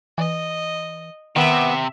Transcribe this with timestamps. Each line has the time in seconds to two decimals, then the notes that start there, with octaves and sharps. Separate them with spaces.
0.18 E3 D#5
1.36 C3 D#3 B3 E5